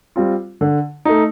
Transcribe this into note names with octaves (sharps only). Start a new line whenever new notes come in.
G3 C4 F4
D3
A3 D#4